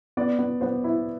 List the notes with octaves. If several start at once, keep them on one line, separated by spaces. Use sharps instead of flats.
B3 D5
B3
B3 C5
E4